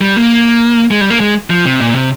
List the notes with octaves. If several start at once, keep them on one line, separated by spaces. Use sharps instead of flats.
G3
A#3
G#3
G3
A#3
G#3
F3
C3
A#2
C3